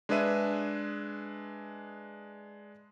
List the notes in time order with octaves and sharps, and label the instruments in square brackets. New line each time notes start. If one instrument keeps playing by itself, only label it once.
[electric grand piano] G#3 D4 G#4 B4 E5 D#7